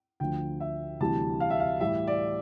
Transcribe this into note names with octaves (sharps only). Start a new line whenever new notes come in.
D2 D3 F3 G5
E5
D2 C3 E3 G3 A5
F5
E5
F5
A2 E3 G3 E5
D5